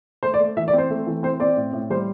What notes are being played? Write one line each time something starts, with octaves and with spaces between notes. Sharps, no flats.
A3 C5
D5
A3
E3 E5
D5
C4 C5
A3
E3
C4 C5
C4 D5
A2
A2
G3 C5